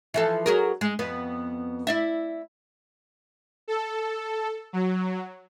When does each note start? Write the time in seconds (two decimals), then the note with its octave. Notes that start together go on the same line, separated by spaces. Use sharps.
0.14 E3 F3 A4
0.46 F#3 G#4 A#4
0.81 G#3
0.99 F2 B3 B4
1.87 E4 D5 E5
3.68 A4
4.73 F#3